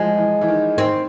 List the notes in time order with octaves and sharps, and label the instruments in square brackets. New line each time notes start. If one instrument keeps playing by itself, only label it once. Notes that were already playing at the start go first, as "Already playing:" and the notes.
Already playing: [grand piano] E3 F3 [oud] G#3
[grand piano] E3
E3
D#3
[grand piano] D#3 [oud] C4